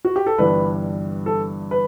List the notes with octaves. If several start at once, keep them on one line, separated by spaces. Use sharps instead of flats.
F#4
G4
A4
G1 G2 E3 G3 D4 B4
A4
B4